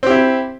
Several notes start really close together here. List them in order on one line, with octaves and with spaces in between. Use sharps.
C4 G4 E4